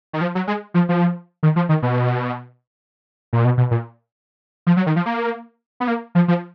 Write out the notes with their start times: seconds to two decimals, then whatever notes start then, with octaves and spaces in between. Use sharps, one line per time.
0.13 D#3
0.21 F3
0.35 F#3
0.47 G#3
0.74 F3
0.89 F3
1.43 D#3
1.56 F3
1.69 D#3
1.82 B2
3.33 A#2
3.45 B2
3.57 B2
3.71 A#2
4.67 F3
4.77 F#3
4.87 D#3
4.96 F3
5.06 A#3
5.80 B3
5.88 A#3
6.15 F3
6.28 F3